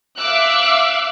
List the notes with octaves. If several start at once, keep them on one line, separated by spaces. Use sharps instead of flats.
E5 F5 D6 E6 F#6